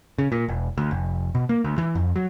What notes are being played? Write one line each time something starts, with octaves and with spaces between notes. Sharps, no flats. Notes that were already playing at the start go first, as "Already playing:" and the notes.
C#3
A#2
E1
D2
F1
B2
A#3
D2
E3
F2
F#3